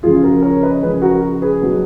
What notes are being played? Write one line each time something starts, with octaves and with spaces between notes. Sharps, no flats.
C#3 F3 G#3 F4 G#4
F#4 A#4
A#4 C#5
B4 D#5
C#3 F3 G#3 G#4 B4
F#4 A#4
G#4 B4
B2 F#3